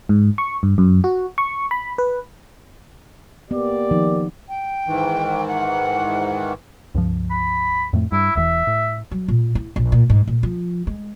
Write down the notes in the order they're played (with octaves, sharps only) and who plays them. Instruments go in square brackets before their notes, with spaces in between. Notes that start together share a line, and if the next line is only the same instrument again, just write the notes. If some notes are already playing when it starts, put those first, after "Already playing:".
[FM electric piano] G#2
C#6
G2
F#2
F#4
C#6
B5
B4
[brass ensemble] A#3 G4 D5 [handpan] B3
[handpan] D#3 F3 D#4
[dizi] G5
[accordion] G#2 D#3 E3
[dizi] F#5
[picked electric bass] C#2 G2 F3
[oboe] B5
[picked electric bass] F2 A2 A3
[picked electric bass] G2 [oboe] E4
[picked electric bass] E1 E2 E3 [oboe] E5
[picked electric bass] A2
[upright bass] F#3
A#2
E4
A#1
A#2
G#2
A#2
F3
G#3